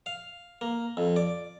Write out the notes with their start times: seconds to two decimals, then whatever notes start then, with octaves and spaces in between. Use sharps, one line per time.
0.06 F5
0.61 A#3
0.97 F2
1.16 D5